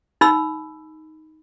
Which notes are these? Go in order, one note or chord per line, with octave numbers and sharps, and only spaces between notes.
D#4 B5 E6